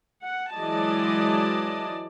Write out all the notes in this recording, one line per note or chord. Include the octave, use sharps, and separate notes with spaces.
F#5
E3 F#3 G#3 D5 D#5 A5